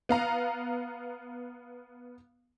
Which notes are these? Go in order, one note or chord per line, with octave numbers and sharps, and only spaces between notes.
B3 F5 A#5